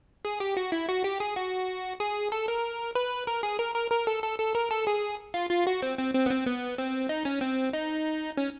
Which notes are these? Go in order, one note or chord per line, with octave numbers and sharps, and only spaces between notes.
G#4
G4
F#4
E4
F#4
G4
G#4
F#4
G#4
A4
A#4
B4
A#4
G#4
A#4
A#4
A#4
A4
A4
A4
A#4
A4
G#4
F4
F4
F#4
C4
C4
C4
B3
C4
B3
C4
D#4
C#4
C4
D#4
C#4